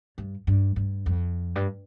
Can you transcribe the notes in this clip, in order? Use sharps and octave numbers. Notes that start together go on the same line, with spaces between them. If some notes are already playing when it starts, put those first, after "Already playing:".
G2
G2
G2
F2
G2